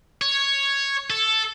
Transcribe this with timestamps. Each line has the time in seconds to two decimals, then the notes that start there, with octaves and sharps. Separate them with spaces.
0.22 C#5
1.10 A4